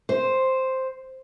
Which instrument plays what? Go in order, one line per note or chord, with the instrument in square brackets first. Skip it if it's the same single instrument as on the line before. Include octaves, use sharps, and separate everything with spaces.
[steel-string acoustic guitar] C5